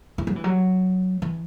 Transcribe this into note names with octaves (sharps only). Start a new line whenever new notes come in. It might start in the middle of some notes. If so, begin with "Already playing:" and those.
E3
F#3
E3
F#3
E3